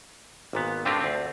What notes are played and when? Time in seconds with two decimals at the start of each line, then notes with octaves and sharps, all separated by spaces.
0.53 G#1 A#2 B3
0.85 G2 D3 A3 C4 F4 G4
1.00 D2 C4